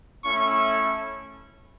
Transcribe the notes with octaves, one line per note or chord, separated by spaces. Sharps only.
A3 C#4 E4 C#6